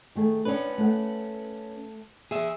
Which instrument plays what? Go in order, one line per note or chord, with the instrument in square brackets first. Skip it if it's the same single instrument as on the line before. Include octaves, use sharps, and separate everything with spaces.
[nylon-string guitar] D#3 A3 G#4
[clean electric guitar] C#4 B4 [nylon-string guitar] D4 C#5
[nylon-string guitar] A3 F#5
[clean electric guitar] G#4 E5